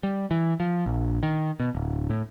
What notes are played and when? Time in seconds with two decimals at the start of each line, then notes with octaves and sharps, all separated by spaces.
0.03 G3
0.31 E3
0.60 F3
0.86 A#1
1.23 D#3
1.60 B2
1.75 D1
2.10 A2